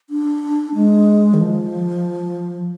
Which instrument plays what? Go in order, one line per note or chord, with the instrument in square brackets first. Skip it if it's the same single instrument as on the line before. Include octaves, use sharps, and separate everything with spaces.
[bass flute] D4
G#3
D#3
F3